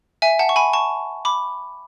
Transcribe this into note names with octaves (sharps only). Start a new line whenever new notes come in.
E5 G#5
F#5 A5
C#6
G#5 B5
A5 C#6
B5 D6